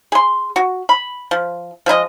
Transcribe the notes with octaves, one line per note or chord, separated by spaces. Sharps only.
G#4 C6
F#4
B5
F3
F3 G#3 E4 D#5